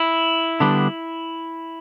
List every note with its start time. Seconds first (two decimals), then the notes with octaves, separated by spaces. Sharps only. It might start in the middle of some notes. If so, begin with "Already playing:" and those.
Already playing: E4
0.60 D3 G3 B3 D4